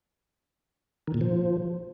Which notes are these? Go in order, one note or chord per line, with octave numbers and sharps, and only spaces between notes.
D#3
A#2
F3